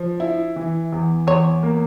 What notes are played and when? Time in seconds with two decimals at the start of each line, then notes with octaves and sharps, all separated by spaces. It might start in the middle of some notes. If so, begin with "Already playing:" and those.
Already playing: F3
0.20 E4
0.56 E3
0.92 E2
1.27 E2 C#5
1.63 A#3